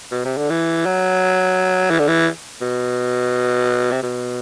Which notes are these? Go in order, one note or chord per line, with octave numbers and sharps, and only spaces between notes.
B2
C3
D3
E3
F#3
E3
D3
E3
B2
C3
B2